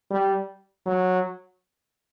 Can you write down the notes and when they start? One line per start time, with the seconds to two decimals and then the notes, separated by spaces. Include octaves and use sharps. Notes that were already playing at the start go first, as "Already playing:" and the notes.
0.11 G3
0.86 F#3